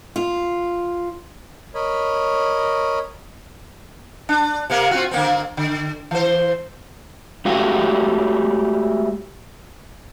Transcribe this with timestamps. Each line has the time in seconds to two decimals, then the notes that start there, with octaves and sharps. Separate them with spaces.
0.16 F4
1.75 A#4 C#5 D#5 B5
4.29 D4
4.70 C3 A#3 A#4
4.91 C4 F4 F#4
5.11 D3 A#3 C4
5.57 D3
6.11 E3 C5
7.45 G#3 A3 F#4 G4 F5 G5